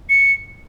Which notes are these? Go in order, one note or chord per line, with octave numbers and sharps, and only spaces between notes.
C#7